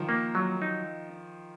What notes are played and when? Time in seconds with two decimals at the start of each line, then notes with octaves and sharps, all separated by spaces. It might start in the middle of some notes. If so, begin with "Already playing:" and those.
Already playing: D#3 F3
0.09 A#3
0.35 F#3
0.62 D#4